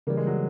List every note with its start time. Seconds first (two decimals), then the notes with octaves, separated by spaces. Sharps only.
0.07 C#3 E3 G3 A#3
0.17 G#3
0.27 F#3